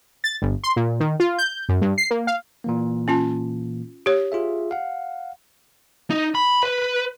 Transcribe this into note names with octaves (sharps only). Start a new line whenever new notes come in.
A6
G1
C6
A#2
D#3
F4
G6
F#2
G2
C7
A#3
F5
A#2 E3 A#3
C#4 F4 A5
G4 C#5
F4 G#4 E5
F5 F#5
D#4
B5
B4